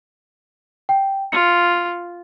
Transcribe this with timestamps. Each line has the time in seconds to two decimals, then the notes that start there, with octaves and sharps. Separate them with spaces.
0.89 G5
1.32 F4 C#7